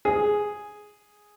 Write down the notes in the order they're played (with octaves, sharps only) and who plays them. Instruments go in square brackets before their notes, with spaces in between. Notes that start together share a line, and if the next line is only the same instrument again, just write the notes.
[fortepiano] G#4